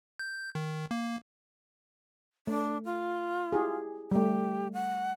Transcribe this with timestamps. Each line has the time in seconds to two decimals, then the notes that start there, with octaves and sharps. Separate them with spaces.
0.19 G6
0.55 D#3
0.91 A#3
2.47 A3 D4
2.85 F4
3.52 E4 G4 G#4
4.11 G3 A3 G4
4.73 F#5